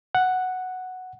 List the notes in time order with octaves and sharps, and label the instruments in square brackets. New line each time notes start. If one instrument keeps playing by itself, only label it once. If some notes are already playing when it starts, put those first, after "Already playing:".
[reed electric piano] F#5